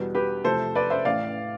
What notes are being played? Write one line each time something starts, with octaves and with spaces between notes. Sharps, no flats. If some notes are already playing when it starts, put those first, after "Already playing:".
Already playing: E2 B2 G3 B3
G4 B4
E2 C3 F3 A3 A4 C5
B4 D5
C5 E5
A1 A2 E3 D5 F5